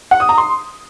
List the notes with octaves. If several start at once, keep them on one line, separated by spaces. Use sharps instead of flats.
F#5
D#6
A#5
C6